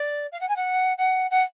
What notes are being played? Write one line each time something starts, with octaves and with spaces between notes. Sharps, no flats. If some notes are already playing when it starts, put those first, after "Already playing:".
Already playing: D5
F5
F#5
G#5
F#5
F#5
F#5